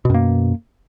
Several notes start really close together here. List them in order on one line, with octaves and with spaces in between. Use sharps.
B2 F#2 A#3